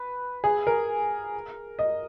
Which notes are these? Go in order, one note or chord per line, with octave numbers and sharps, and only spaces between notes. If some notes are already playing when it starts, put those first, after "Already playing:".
Already playing: B4
G#4
A#4
D#5